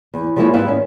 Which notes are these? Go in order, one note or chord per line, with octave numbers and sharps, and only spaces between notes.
E2
F3 G3 G#3 A#3 E4 C#5
G#2 G3 B3 E4 B4 F5
D#3 C#4